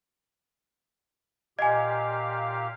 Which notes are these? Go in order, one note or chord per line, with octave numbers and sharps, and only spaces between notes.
A#2 G4 D#5 F5 G#5